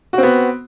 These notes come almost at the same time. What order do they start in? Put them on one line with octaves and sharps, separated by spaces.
F#4 C4 B3